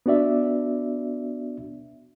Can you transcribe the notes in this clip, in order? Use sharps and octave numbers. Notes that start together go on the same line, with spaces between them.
B3 D4 F#4 D5 E5